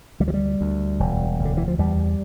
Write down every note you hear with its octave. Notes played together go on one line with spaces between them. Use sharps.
D2 G3
F3
G3
D2
E1
D2
D3
E3
F3
E2 G3